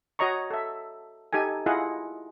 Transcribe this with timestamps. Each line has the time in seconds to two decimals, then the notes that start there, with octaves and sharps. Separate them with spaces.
0.19 F#4 C#5 D#5 A#5 C#6
0.51 A4 E5
1.33 D#4 G4 A4 G#5
1.66 E4 F4 G#4 D#5 F#5